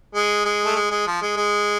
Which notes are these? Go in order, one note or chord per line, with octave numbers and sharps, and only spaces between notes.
G#3
G#3
A3
G#3
G#3
F3
G#3
G#3